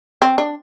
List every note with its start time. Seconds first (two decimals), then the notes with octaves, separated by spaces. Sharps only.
0.22 C4
0.38 D4